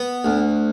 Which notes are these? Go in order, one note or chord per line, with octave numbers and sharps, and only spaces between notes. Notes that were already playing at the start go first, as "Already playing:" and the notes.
Already playing: B3
D2